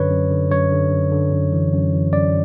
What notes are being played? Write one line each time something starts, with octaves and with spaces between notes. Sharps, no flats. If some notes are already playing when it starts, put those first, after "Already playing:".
Already playing: F#2 D3 B4 C#5
F#2
D3
F#2 C#5
D3
F#2
D3
F#2
E3
F#2
E3
F#2 D5